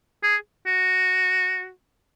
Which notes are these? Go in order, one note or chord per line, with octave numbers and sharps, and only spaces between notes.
G#4
F#4